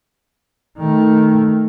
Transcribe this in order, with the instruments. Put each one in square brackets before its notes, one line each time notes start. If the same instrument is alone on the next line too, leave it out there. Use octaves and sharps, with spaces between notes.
[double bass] D#3 A3